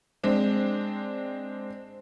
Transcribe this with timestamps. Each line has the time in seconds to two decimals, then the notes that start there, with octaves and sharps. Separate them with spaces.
0.24 G#3 C4 D4